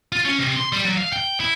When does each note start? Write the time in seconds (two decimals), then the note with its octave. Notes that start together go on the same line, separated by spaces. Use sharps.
0.12 F4
0.25 C#4
0.39 C3
0.56 C6
0.73 G3
0.85 F#3
0.97 F5
1.13 G5
1.40 E4